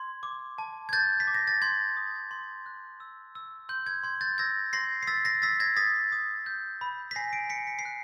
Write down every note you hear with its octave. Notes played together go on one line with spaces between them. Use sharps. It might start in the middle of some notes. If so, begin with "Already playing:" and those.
Already playing: C6 G#6
D6
A5
G#6
G6 A6
B6
D6
A#6
A6
C6 G#6
D#6
C6
F#6
E6
E6
C6 G6
G#6
C6 G#6
G6 A6
E6 G#6 A#6
C6 A#6 C7
C7
E6 A6 B6
A#6 C7
E6 A6 B6
G#6 A#6
D#6 A6 B6
D#6
G6
B5
B6
G#5 A#6 C7
C7 D7
G#5 B6 C#7
B6
C7
F#6